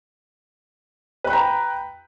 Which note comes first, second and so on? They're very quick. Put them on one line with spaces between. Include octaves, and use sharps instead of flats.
B4 B5 G5 A#5